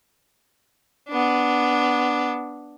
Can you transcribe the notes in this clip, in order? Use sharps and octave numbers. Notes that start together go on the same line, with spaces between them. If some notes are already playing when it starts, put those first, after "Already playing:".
B3 D4